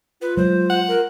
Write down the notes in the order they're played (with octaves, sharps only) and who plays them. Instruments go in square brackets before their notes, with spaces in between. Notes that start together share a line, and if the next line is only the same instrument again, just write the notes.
[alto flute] F4 [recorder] B4
[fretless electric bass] F#3 G#3 [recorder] C5
[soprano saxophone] F#5
[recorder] A#4